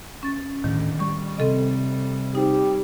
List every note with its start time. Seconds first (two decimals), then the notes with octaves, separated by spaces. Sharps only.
0.23 C#4 A6
0.64 D2 A2 D#3
1.00 G3 C#6
1.38 C3 C4 A4 D#5
2.35 D#4 G4 C5